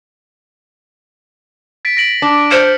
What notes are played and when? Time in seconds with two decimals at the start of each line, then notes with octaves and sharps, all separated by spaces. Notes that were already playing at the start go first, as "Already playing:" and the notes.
1.85 A6 B6 D7
1.97 A#6 D7 F#7
2.22 D4
2.51 C5 F6 C#7